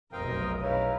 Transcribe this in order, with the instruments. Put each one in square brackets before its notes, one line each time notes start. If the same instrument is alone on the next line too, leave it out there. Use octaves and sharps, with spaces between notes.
[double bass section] F1 B1 F#2 [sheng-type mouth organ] C4 F5 G5 [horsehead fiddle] A#4 D#5
[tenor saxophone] C#3 [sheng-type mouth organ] D#4 E4 A#4 [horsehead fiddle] B4 F5